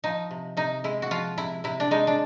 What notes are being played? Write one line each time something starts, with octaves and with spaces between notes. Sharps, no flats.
F3 D#4
C3
C3 D#4
G#3 E4
F#4
F3 F4
C3 E4
C3 E4
D4
G#3 D#4
D4